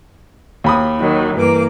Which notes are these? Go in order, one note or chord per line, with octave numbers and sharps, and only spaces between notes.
D#2 B5 D#6
D#3 F#3
G2 E3 A#3 D6